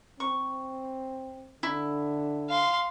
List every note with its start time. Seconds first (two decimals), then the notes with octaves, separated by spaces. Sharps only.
0.20 C4 C#6
1.63 D3 E4
2.49 F5 C6